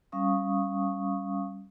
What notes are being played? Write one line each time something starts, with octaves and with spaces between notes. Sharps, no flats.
G3 C#4 F5 C#6 D#6